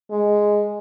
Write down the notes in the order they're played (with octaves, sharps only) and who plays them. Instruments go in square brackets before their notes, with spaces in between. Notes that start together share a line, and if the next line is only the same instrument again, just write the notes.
[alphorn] G#3